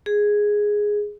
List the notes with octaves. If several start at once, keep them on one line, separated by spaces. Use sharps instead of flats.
G#4